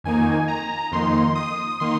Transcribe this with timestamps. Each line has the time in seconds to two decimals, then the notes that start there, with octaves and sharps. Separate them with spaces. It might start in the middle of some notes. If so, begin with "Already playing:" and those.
0.04 F2 D#3 A#3 D#4 G#5
0.48 A#5
0.92 F2 D#3 A#3 D#4 C6
1.35 D#6
1.80 D#3 A#3 D#4 C6